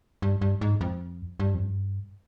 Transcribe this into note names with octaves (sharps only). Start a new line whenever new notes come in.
G2
G2
G#2
F2
G2
F2
G2